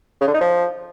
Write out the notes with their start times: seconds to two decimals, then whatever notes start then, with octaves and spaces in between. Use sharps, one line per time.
0.21 C#3
0.27 D3
0.34 D#4
0.41 F3